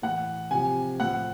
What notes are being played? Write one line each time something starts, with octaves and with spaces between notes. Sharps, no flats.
A2 E3 F#5
C3 F3 G#5
A2 F3 F#5